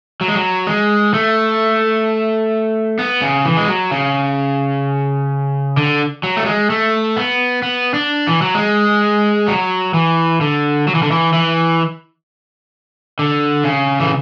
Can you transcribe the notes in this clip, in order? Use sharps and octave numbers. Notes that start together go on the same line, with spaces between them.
F#3
G#3
F#3
G#3
A3
B3
C#3
E3
G#3
F#3
C#3
D3
F#3
A3
G#3
A3
B3
B3
D4
E3
F#3
G#3
F#3
E3
D3
F#3
E3
D3
E3
E3
D3
C#3
E3